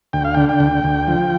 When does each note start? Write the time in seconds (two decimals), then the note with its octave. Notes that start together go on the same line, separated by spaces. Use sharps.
0.13 D2 G5
0.25 F5
0.35 D3 G5
0.49 G5
0.60 D2
0.84 D2
1.08 F3